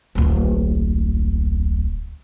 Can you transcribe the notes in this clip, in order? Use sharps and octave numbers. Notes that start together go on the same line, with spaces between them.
D1 A#1